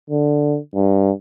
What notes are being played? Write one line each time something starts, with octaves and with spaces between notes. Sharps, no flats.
D3
G2